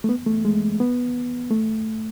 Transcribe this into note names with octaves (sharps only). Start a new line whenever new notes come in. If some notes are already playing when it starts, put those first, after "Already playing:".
A3
B3
A3
G#3
B3
A3